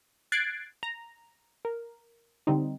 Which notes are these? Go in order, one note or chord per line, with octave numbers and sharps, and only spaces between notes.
F#6 G#6 A6 C7 D7
A#5
A#4
D3 G3 C4 D#4